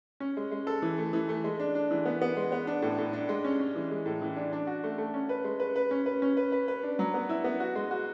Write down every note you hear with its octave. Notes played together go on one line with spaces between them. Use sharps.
C#4
G#3
G#3
A4
E3
A3
E3
A3
G#3
D4
D4
E3
B3
B3
G#3
B3
D4
A2
A2
D4
G#3
C#4
C#4
E3
G#3
A2
E3
D4
D4
F#4
A3
A3
C#4
B4
G#3
B4
B4
C#4
B4
C#4
B4
B4
B4
D4
F#3
B3
E4
B3
F#4
G#3
F#4